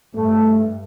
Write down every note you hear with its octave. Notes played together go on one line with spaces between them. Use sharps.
G2 A3